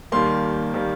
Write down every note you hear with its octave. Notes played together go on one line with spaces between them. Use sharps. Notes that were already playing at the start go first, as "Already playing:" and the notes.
D#2 D#3 G3 A#3 C6
D#3 G3 A#3